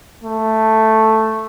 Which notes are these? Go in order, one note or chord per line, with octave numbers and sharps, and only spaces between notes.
A3